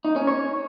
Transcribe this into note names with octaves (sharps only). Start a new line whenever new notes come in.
D#4
C#4
C#5